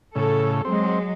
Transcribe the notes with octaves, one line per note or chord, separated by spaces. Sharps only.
A2 C#3 A4
F#3 G#3 C4